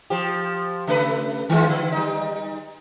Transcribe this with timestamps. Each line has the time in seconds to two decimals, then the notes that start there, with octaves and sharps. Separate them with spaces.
0.10 F3 G4
0.87 C#3 A3 B4
1.49 D#3 G#3 F4
1.69 D3
1.92 G3 D#4